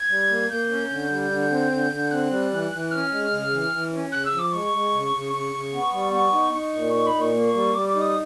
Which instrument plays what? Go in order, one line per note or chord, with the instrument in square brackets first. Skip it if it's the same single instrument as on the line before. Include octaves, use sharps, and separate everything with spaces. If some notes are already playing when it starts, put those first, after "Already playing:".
Already playing: [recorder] G#6
[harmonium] G3
A#3
[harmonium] A#3 [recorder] G6
[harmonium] C#4
D3
G3
D3
C4
D3
D3
[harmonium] C4 [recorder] F#6
[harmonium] G3
E3
E3
[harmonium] C#4 [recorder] F6
[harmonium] G#3
C#3
E3
E3
C#4
[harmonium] C#3 [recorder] F#6
[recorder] E6
[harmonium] F3
[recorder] D6
[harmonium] G#3 [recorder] C#6
[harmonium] G#3
C#3
C#3
[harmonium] C#3 [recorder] C#6
[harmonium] C#3
B3
G3
[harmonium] B3 [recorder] C#6
[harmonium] D#4
[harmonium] D#4 [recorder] C#6
[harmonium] A#2
[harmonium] D#4 [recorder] C#6
[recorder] B5
[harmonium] A#2
[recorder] C#6
[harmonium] A#3
G3
[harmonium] G3 [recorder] D6
[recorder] D6
[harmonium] D#4
[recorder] D#6